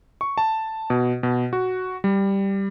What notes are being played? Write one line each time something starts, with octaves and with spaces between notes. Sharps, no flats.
C#6
A5
B2
B2
F#4
G3